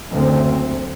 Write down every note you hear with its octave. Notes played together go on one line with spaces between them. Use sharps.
F#1 D2 C4